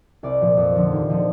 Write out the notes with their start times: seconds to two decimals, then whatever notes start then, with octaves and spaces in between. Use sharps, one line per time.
0.23 C2 D5
0.41 A#2 F3
0.57 F2
0.75 D3 F3
0.92 D#2
1.10 D3 F3